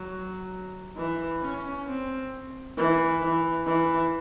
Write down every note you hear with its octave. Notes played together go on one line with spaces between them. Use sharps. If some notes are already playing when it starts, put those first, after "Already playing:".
Already playing: F#3
E3
C#4
C4
E3
E3
E3